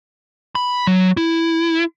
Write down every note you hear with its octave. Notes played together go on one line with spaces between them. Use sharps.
B5
F#3
E4